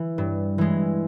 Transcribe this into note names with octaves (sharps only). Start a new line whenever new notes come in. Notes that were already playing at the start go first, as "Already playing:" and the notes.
Already playing: E3
G2
E3 G#3